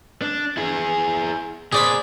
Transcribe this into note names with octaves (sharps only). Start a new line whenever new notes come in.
D4
E4 G#4
A#2 G#4 C5 D5 B5